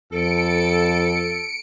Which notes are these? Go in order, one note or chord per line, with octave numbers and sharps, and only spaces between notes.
F2 A4 C#7 D7